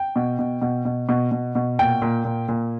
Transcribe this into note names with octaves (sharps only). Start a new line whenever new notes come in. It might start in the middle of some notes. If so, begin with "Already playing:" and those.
Already playing: G5
B2
B2
B2
B2
B2
B2
B2
A#2 G5
A#2
A#2
A#2